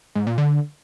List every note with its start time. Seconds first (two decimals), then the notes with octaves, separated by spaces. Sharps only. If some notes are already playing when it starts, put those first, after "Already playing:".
0.16 G#2
0.27 A#2
0.38 D3